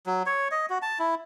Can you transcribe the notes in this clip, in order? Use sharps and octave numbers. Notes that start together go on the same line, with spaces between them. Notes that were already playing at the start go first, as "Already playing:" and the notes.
F#3
C#5
D#5
F#4
A5
E4